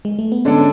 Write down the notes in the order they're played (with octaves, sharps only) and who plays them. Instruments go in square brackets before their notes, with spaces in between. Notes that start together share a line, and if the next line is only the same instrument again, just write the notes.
[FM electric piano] G#3
A3
B3
[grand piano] D3 G#3 D4 A4 D5 [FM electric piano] C#4